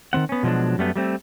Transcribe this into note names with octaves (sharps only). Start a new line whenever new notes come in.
D#3 E3 C4 F#5
B3 C#4
B2 F3 F#3 G#3 D4
F#2 G3 A3 B3
G3 A3 C4